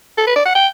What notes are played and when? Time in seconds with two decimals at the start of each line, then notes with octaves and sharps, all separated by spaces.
0.18 A4
0.27 B4
0.36 D5
0.46 F#5
0.55 G5